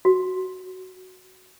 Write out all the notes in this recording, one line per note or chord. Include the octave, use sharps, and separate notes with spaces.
F#4